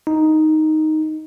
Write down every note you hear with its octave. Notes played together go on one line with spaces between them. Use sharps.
D#4